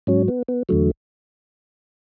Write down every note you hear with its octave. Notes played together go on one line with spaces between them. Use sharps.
G#2 F#3 C#4
B3
B3
E2 D3 F#3 A3